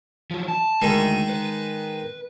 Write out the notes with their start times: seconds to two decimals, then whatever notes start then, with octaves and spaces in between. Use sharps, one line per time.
0.31 F3 F#3
0.48 A5
0.82 D2 D#3 G#3 D#4
1.29 B4